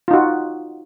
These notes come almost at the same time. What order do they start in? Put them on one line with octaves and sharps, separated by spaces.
F4 D#4 F#4